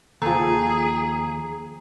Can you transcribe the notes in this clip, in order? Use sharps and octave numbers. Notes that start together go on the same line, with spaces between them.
D#2 F3 G#4 A4 A#5